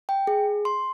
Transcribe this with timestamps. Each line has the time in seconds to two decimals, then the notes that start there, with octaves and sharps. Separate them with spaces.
0.09 G5
0.27 G#4
0.65 C6